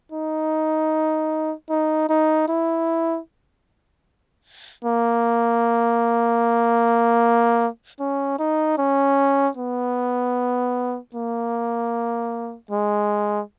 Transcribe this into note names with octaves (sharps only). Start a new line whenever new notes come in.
D#4
D#4
D#4
E4
A#3
C#4
D#4
C#4
B3
A#3
G#3